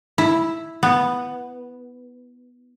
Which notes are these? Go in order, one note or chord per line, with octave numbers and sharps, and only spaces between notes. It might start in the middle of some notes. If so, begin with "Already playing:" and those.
E4
B3